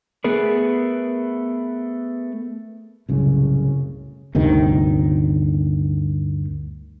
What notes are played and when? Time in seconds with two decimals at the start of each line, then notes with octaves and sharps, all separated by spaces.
0.24 A3 B3 G#4 A#4 B4
3.09 C2 F#2 A2 C#3
4.35 G1 D2 C3 D#3